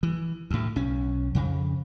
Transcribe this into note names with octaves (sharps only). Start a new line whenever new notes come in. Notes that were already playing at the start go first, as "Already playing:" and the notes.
E3
D2 A2
B1 C#4
F2 C#3